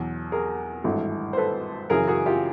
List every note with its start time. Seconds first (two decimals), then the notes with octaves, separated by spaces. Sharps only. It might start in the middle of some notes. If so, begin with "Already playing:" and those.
Already playing: E2 B2 F#3
0.32 G#4 A#4
0.84 G#1 G2 E3 A3
1.33 C5
1.37 A4 B4
1.90 F#2 C#3 E3 G#4 A#4
2.08 F#4 G#4
2.26 F4 G4